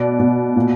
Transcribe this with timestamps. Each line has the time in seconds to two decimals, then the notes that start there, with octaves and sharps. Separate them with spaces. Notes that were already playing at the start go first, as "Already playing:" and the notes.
Already playing: B2 D5
0.19 B2
0.56 A#2